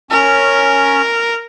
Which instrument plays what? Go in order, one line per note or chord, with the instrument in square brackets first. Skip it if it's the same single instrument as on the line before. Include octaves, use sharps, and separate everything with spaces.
[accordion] C#4 [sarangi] A#4